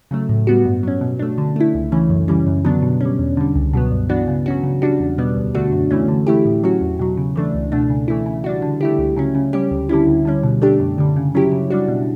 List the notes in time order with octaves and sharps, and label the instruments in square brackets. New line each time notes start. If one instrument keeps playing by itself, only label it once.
[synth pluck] C#3 F#3 A3
A2
G3 B3 F#4
G2
F#3 C#4
B2
A3 D4
D3
A3 E4
C#2
C#3 E3 A3 C#4
F#2
C#3 E3 G3 C#4
F#2
D3 F#3 B3 D4
B2
G3 C#4
E2
D3 G3
C#2
B2 F#3 B3
G2
E3 B3 D4 F#4
C#3
F#3 C#4 F#4
C#3
G3 D4 F#4
E2
B2 G3 B3
D2
D3 A3 D4 F#4
F#2
E3 A3 C#4
D3
A3 E4 G4
A2
F#3 C#4 F#4
E2
B2 F#3
C#3
E3 A3 D4
C#2
B2 A3 D4
C#3
E3 A3 E4
C#3
G3 D4 F#4
D3
A3 E4 G4
C#2
C#3 F#3 C#4
C#3
G3 C#4 G4
D2
D3 G3 C#4 E4
D2
D3 G3 C#4
B2
A3 D4 G4
F#2
D3 G3
C#3
F#3 C#4 E4 G4
C#3
G3 D4 F#4
B2